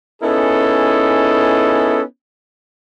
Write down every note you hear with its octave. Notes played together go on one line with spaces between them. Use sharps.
B3 C#4 D#4 E4 G#4 A4